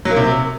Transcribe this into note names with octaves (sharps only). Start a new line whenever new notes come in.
F#3
A#3
C3